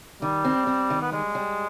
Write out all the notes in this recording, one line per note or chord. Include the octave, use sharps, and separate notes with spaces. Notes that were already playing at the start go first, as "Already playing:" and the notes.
D#3 G3
C4
C4
D#3
B3
G3 G#3
G3